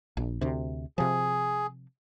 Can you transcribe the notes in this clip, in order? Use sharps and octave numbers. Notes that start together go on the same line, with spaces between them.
A#1
D2 C3
C3 F3 G#4